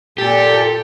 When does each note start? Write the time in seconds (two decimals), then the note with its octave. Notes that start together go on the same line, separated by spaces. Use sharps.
0.18 A#2 G4 A4